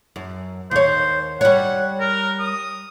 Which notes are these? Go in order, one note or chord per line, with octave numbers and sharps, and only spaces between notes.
F#2
D#2 C5 C#5
G3 C#5 F#5
A#4
D#6